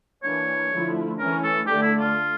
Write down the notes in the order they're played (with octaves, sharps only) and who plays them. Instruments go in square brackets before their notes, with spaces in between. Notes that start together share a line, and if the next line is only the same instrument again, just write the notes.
[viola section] E3 A#3 D4 [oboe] C#5
[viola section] D3 F3 A3 E4
[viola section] E3 A3 C#4 [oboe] A#4
[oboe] A4
[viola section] D3 A3 D4 A4 D5 [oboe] G4
[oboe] E4
F4